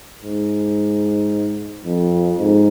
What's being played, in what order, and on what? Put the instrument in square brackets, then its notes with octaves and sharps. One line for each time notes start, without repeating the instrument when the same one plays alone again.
[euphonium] G#2
F2
G#2